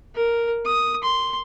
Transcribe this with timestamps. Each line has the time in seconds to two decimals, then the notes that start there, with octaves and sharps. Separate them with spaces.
0.15 A#4
0.66 D#6
1.04 C6